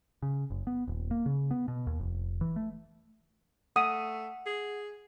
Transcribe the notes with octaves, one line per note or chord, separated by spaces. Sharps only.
C#3
F#1
B3
D#1
A#3
C#3
B3
B2
D#2
F1
E3
A3
A3 F#5 D#6
G#4